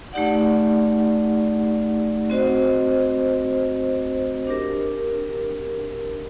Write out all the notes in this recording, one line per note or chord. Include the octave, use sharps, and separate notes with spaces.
A3 D#4 G4 D5 F#5
C4 F#4 C5 D#5
D4 G4 A#4